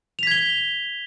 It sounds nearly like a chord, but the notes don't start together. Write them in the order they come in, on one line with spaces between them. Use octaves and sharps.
F7 B6 G#6 G7